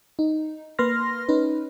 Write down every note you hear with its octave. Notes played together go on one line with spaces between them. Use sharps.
D#4
A#3 B4 C6 F6 A#6
C#4 D#4 B4